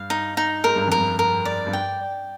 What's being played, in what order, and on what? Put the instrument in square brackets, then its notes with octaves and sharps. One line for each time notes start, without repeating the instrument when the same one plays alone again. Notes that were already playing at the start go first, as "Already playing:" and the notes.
Already playing: [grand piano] G2 [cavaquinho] F5
[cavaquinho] D#4
D#4
[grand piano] G#2 [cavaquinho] A#4
[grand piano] G2
[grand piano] F2 [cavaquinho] A#4
[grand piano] G2
[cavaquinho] A#4
D5
[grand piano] G2
[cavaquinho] G5